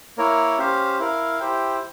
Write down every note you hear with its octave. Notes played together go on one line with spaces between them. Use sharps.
A#3 E4 A#4 C#5
C#4 G4 C5 F5
E4 A#4 F5
E4 G4 C5 G5